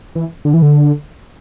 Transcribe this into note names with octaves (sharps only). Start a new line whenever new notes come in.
E3
D3
E3
D3